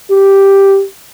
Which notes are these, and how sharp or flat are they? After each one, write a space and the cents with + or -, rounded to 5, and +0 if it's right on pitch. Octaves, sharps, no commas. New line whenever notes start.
G4 +0